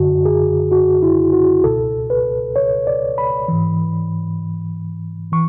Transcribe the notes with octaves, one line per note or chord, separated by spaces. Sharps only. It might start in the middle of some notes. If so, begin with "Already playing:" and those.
Already playing: F#2 D3 F#4
G#4
F#4
E4
F#4
C#2 B2 A4
B4
C#5
D5
B5
G#2 E3
E3 C#6